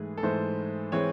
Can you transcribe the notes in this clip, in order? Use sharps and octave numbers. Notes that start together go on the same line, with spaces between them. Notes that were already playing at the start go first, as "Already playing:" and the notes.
Already playing: G#2 E3 A3 G#4
A4
G#2 E3 A3 C5
E3 G#3 C4 C#5